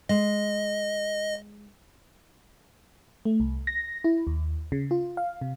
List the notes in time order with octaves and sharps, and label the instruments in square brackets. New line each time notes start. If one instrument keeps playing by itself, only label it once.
[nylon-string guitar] G#3 [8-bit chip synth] D#5
[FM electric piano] A3
C2
A#6
E4
D#2
C#3
F4
F5
C3